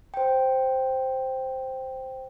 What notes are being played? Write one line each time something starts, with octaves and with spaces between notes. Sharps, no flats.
C5 G5